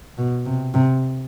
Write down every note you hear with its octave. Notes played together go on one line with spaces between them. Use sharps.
B2
C3
C3